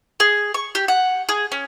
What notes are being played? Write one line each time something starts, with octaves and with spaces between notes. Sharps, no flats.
G#4
C#6
G4
F#5
G#4
C#4